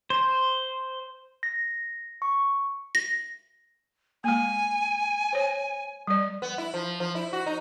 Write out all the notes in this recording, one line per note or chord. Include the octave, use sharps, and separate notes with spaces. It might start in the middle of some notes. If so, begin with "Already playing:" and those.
C5
A#6
C#6
A#6
G#3 A#3 G#5
C5 C#5
G3 D5
B3
E4
F3
F3
E4
F#4
D#4